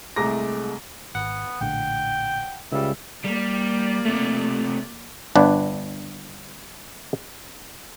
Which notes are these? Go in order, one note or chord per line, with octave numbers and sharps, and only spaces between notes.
C2 G#3 A3 A#5 D6 A#6
G#1 B3 F#5
A#1 A2 D3 G5
C#2 C#3 G3 E5
G3 A#3 D5
C3 A3
G1 D4 B4